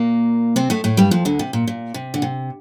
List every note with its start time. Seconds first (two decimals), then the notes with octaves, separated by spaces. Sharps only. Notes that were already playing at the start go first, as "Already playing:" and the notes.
Already playing: A#2 A#3
0.56 C3 C4
0.70 A2 A3
0.84 A2 A3
0.97 G2 G3
1.11 F2 F3
1.25 D2 D3
1.39 C3
1.53 A#2
1.67 A#2
1.94 C3
2.14 D3
2.22 C3